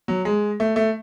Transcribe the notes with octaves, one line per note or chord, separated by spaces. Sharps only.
F#3
G#3
A3
A3